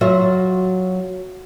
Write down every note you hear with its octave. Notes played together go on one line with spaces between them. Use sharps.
F#3 F4 F#4 E5